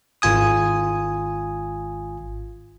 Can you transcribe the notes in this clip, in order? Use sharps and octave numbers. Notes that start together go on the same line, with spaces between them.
G#1 F4 G#5 D#6